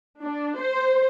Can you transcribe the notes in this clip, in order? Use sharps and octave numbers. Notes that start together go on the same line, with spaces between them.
D4
C5